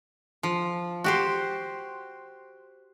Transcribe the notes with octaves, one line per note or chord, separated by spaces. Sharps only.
F3
F#4 G4 C5